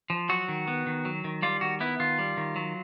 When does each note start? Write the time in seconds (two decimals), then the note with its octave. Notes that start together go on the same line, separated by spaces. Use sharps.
0.10 F3
0.29 F#3 F#4
0.48 D#3
0.68 B3
0.86 D#3
1.05 F#3
1.24 D#3
1.42 G3 F4
1.61 D#3 F#4
1.80 B3 E4
2.00 D#3 F4
2.19 G3
2.37 D#3
2.56 F#3